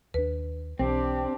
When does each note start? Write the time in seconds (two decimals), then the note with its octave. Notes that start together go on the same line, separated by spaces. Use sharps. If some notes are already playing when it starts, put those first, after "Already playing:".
0.14 D#2 D4 B4
0.79 B1 E3 C4 D4 G4